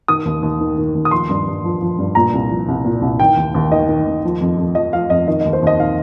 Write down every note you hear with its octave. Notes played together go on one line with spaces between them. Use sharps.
D#3 D#6
D#2
D#2
D#3
D#3
D#2
D#6
F3 C6
G2
G2
F3
F3
G2
A#2 A#5
C2
F3
C2
A#2
C2
D#3 G5
D#2
D#2
D#3 D#5
D#3
D#2
F3
F2
F2
F3 D#5
F3 F5
F2 D#5
D#3 D#5
D#2 D#5
C5
D#2 D#5
D#3 F5